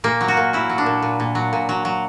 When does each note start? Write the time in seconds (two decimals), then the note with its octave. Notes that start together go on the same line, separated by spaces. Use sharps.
0.04 A#2 A#3
0.21 F#3
0.28 F#4
0.37 A#2
0.53 F#3 E4
0.70 F#3
0.78 D4
0.86 A#2
1.02 A#2
1.20 A#2
1.35 F#3
1.53 A#2
1.69 F#3
1.85 F#3